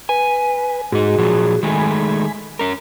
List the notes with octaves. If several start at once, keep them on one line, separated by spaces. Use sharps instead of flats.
B4 G#5
G#2 D#4 F#4 G#4
A#2 F3 F#3
D#3 G#3 A3 G#5 B5
C#4 A#4